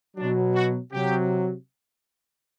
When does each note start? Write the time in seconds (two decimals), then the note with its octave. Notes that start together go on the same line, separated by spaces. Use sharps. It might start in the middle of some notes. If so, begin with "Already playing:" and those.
0.17 B2 F#3 D4
0.54 F#4
0.92 C3 F#3 G4